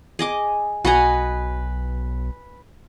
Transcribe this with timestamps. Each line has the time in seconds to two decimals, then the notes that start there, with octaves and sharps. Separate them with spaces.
0.19 G#4 D#5 D6
0.85 B1 F#4 B4 D#5 G#5 A#5